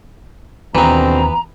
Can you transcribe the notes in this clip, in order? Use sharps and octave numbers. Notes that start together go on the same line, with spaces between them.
D#2 B2 D3 E3 B3 C4 A#5